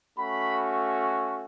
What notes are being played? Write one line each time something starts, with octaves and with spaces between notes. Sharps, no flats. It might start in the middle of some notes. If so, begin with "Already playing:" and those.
A3 C#4 F#4 B5